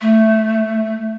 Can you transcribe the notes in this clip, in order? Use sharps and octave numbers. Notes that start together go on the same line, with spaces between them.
A3